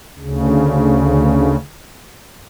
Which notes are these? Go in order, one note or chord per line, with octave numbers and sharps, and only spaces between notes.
D2 C#3